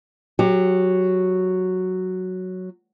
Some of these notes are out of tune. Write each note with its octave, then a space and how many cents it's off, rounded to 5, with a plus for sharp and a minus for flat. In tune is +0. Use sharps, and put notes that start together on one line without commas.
F#3 +0 G4 +20